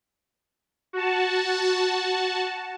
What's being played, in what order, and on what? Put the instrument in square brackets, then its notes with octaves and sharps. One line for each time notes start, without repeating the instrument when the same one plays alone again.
[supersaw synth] F#4 A5